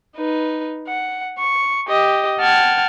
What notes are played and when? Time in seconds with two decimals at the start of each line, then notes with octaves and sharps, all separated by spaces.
0.17 D#4 B4
0.88 F#5
1.38 C#6
1.88 G4 D#5
2.39 F#5 G5 A5 F6 G#6